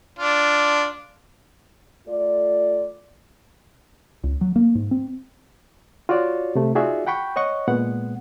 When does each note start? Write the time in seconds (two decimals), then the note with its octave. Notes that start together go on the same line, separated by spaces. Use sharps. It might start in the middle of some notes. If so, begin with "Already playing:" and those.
0.19 D4 F4
2.07 A3 F4 A4 D5
4.24 C#2
4.41 F#3
4.56 A#3
4.75 G#2
4.91 C4
6.09 F4 F#4 C#5 D5
6.55 C3 A3
6.75 D#4 F4 F#4 G#4 D5 E5
7.07 F#5 G5 B5 C#6 G6
7.36 C#5 D#5 F#5 C#6
7.68 A#2 G#3 B3 F#5